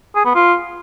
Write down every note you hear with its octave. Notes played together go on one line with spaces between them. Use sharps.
G#4
B3
F4